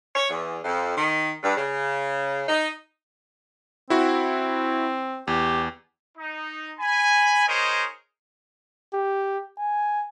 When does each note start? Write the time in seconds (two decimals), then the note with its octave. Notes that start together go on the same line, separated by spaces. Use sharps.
0.14 C#5
0.29 E2
0.64 F2
0.96 D#3
1.43 G2
1.57 C#3
2.48 D#4
3.90 C4 E4 F#4
5.27 E2 G4
6.18 D#4
6.79 G#5 B5
7.48 D#4 G#4 A#4 C5 C#5 D#5
8.94 G4
9.58 G#5